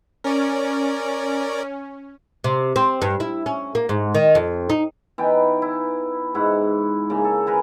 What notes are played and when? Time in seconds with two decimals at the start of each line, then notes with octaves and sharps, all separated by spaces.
0.24 C#4 A#4 D5
2.44 C3
2.76 C4
3.02 G2
3.20 E4
3.46 C#4
3.75 A#3
3.89 G#2
4.15 D#3
4.35 F2
4.70 D#4
5.18 E3 B3 D#4 G5
5.62 E4
6.34 G#2 E4 F#5
7.10 C#3 A#3
7.24 A4
7.47 A#4 B4 G#5